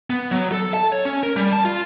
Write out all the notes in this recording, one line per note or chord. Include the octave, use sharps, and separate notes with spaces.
B3
F#3
A4
A5
C#5
C#4
A#4
G3
A5
F4